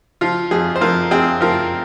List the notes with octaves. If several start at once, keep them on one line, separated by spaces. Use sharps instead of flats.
F3 F4
F2 G#4
C5
F2 F4 A#4
C4 G#4
F3 F4 A#4